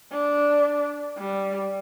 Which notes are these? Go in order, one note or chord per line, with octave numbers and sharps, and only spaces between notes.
D4
G3